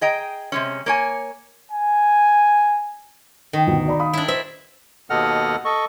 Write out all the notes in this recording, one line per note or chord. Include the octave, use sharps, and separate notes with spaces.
G#4 D#5 G5 A#5
C3 G#3 C#4
A#3 C#5 G#5
G#5
D#3
D2 B2
D5 A#5 B5
F5 B5 D#6
D4 E4
C5 E5
D#2 B2 A4 D#5 F#5 F6
A4 D#5 C#6